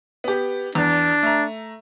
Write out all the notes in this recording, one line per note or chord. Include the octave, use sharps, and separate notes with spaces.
B3 G4
E2 D4
A3 A#5